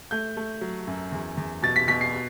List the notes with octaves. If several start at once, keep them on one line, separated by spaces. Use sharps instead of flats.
A3 G6
A3
F#3
F#2
E2
E2
B2 A6
B6
B2 B6
C7